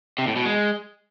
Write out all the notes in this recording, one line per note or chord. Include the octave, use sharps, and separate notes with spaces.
C3
A2
B2
G#3